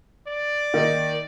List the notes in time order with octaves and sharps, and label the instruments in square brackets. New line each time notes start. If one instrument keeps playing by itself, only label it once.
[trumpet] D5
[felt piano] D#3 A#3 D#4